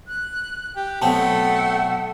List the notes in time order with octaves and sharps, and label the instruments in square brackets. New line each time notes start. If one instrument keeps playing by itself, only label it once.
[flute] F#6
[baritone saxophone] G4
[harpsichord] B1 B3 C4 [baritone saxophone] A3 [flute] F#5 [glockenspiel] A5